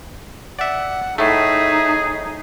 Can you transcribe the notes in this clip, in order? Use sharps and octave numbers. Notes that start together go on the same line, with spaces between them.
D5 E5 F#5
A2 A3 D#4 G#4 E5